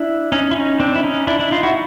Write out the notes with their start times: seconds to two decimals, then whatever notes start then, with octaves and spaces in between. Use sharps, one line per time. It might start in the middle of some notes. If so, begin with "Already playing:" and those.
Already playing: D4 E4
0.32 C#4 D#4
0.51 E4
0.56 C#4 D#4
0.80 C4 D4
0.96 E4
1.03 C#4 D#4
1.27 D4 E4
1.39 D4 E4
1.51 D#4 F4
1.63 E4 F#4